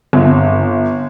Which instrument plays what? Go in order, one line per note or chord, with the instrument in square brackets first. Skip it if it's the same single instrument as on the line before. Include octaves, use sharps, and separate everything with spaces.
[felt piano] G1